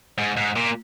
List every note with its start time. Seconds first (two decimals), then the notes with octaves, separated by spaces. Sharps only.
0.18 G#2
0.37 G#2
0.56 A#2